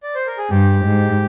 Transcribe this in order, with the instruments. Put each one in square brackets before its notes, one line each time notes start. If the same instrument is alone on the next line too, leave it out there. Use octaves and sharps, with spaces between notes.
[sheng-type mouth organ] D5
C5
A#4
G#4
[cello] G2 [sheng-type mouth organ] G4
[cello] G#2